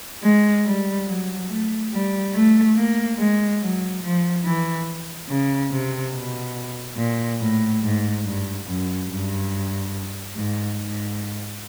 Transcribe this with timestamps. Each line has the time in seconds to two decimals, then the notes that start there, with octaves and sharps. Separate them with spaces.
0.23 G#3
0.65 G3
1.07 F#3
1.49 A3
1.92 G3
2.34 A3
2.76 A#3
3.18 G#3
3.61 F#3
4.03 F3
4.45 E3
5.29 C#3
5.72 C3
6.13 B2
6.98 A#2
7.40 A2
7.82 G#2
8.25 G2
8.66 F#2
9.09 G2
10.35 G#2
10.78 G#2